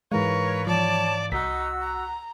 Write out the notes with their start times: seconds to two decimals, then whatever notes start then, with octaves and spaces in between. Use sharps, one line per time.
0.12 G#2 E3 G#3 A#4 B4 C#5 F5
0.67 F3 C#5 D5 A5
1.32 C2 D#4 F#4 E6 B6
1.82 A#5